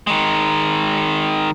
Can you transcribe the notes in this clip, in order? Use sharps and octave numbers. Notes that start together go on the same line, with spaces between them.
D#3 G#3